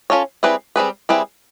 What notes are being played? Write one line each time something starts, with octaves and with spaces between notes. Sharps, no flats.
C#4 F4 A4 C#5
G3 C4 E4 G#4 B4
G3 C4 E4 G#4 B4
G3 C4 E4 G#4 B4